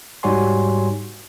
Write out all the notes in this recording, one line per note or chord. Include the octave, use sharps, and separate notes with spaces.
G#2 G3 F#4 C#5 G#5 C6